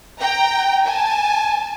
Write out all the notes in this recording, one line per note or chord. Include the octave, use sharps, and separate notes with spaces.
G5 A#5
G#5 A5